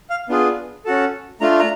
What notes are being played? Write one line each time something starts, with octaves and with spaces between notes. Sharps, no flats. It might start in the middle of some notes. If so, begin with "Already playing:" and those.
F5
B3 D4 F4 G#4
C#4 F#4 A4
A3 D4 F4 A#5
A#5